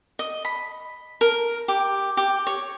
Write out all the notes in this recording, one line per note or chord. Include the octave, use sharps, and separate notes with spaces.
D#5
B5
A#4
G4
G4
C#5